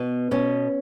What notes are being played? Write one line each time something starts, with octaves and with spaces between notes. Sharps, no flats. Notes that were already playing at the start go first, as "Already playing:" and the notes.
Already playing: B2 B3
B2 C#4